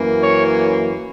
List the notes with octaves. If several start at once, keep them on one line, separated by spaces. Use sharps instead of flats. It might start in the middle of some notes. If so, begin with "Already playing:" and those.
Already playing: F#2 E3 A#3
C#5